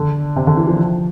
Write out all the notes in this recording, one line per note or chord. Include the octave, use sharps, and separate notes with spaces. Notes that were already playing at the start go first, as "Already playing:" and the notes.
Already playing: D3
C3
D3
E3
F3